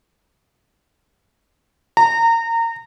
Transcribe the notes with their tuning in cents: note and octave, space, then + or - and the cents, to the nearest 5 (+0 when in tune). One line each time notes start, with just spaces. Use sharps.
A#5 -25